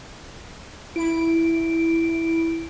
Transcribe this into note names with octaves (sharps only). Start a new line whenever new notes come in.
E4 D7